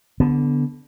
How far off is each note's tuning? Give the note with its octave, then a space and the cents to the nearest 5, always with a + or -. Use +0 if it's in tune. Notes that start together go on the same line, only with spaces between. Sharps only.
D3 -10 B3 +0